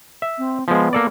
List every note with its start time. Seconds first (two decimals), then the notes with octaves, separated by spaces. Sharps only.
0.22 E5
0.38 C4
0.68 F3 G#3 B3
0.93 A#3 A4 D5